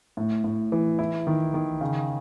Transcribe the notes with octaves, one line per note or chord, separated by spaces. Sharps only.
A2
A2
E3
E4
D#3
D#3
C#3